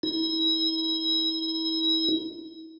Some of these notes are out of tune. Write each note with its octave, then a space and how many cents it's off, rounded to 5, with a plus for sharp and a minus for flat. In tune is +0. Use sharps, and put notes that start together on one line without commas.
E4 -40